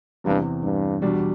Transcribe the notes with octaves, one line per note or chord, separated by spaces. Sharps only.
E2 G2 C3 E3
G2
E2 B2 G3 D4